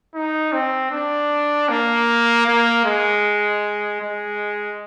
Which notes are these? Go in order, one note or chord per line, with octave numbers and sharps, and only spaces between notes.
D#4
C4
D4
A#3
A#3
G#3
G#3